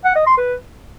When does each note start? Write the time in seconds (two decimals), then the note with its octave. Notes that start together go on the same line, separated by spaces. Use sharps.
0.04 F#5
0.15 D#5
0.27 C6
0.38 B4